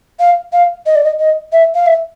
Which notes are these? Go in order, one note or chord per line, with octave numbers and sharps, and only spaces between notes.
F5
F5
D#5
D5
D#5
D#5
E5
F5
E5